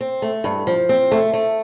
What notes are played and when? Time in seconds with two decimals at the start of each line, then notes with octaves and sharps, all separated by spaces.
0.01 C4
0.22 A3
0.44 G2
0.67 F3
0.89 C4
1.11 A3
1.34 A3